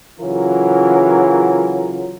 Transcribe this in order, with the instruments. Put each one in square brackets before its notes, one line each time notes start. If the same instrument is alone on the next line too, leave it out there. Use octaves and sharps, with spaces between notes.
[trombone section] C#3 E3 F#3 F4 A#4